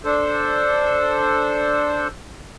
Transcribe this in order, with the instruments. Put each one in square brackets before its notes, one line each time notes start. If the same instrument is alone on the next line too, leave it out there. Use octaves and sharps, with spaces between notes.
[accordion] D4 A4 C5